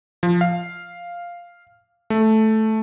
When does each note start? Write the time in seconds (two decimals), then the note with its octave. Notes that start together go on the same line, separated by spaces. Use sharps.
0.23 F3
0.41 F5
2.10 A3